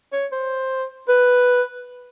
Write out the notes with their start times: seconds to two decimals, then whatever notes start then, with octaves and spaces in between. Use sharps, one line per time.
0.13 C#5
0.32 C5
1.09 B4